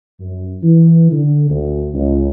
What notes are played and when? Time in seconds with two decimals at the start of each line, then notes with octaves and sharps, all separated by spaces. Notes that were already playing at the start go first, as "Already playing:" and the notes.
0.20 F#2
0.62 E3
1.11 D3
1.50 D2
1.94 C#2